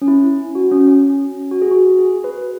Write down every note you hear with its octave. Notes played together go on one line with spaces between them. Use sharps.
C#4
E4
F#4
C#4
C#4
F#4
G#4
F#4
G#4
B4